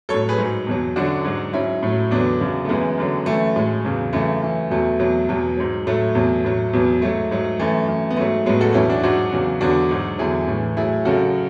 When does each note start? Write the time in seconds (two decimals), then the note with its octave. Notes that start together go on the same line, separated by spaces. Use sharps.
0.09 F#3 A4 C#5
0.14 A2
0.29 G#4 B4
0.38 G#2 F#3
0.67 E2 B2 F#3
0.96 F#2 D3 F#3 D4 F#4
1.25 G#2 F#3
1.53 G#2 F#3 C#4 E4
1.83 A2 F#3
2.11 E2 D3 F#3 B3 D4
2.40 F#2 C#3 F#3
2.65 A3
2.69 F#2 E3 G#3 B3
2.98 F#2 D3 F#3
3.26 F#2 E3 A3
3.56 A2 F#3 G#3
3.85 E2 C#3 F#3
4.13 F#2 C#3 E3 A3
4.42 F#2 E3
4.70 E2 B2 F#3 A3
4.99 E2 B2 F#3
5.29 E2 B2 F#3
5.57 G#2 F#3
5.87 A2 F#3 A3
6.15 E2 B2 F#3
6.45 A2 F#3
6.73 E2 B2 F#3
7.01 G#2 F#3 A3
7.31 G#2 F#3
7.59 F#2 E3 A3
7.88 F#2 E3
8.10 B3
8.17 G#2 F#3 A3
8.46 A2 F#3 G#3 B3
8.61 F#4 A4
8.74 E2 B2 F#3 C#4 E4
8.89 D4 F#4
9.03 G#2 F#3 D4 F#4
9.32 E2 C#3 F#3
9.61 E2 D3 F#3 D4 F#4
9.91 G#2 F#3
10.18 E2 D3 F#3 E4 G#4
10.48 A2 E3
10.77 A2 F#3 E4 G#4
11.05 F#2 C#3 F#3 F#4 A4